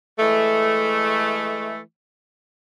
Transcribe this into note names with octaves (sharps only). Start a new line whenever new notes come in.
E3 G#3 A3